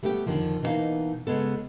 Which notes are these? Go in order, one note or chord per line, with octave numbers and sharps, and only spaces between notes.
G3 A3 B3 F#4 G4
F2 A2 D3 D#3 F3
B2 E3 F#3 A#3 D#4 F5
C#3 G#3 B3 A4